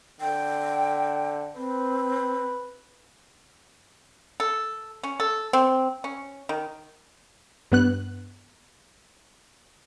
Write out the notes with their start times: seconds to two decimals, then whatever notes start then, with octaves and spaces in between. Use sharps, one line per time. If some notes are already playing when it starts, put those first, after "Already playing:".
0.21 D3 G5
1.56 C4 B4
4.40 A4
5.03 C#4
5.20 A4
5.53 C4
6.04 C#4
6.49 D#3
7.72 G2 B3 F#6